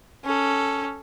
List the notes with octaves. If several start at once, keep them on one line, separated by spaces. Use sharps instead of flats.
C#4 A4